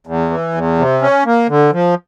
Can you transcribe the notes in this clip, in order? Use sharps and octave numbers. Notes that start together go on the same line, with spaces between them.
E2
E3
E2
C3
C#4
A#3
D3
F3